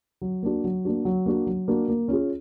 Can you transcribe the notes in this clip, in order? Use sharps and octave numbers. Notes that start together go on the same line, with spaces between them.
F#3
A#3 D4 F#4
F#3
A#3 D4 F#4
F#3
A#3 D4 F#4
F#3
A#3 D4 F#4
A#3
C#4 F4 G#4